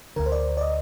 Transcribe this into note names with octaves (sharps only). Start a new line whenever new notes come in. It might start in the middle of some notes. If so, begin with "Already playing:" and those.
D2 D3 A#4
C5
D5
D5
D#5